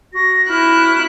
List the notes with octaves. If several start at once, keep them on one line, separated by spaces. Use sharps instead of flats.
F#4 A#6
E4 F6 F#6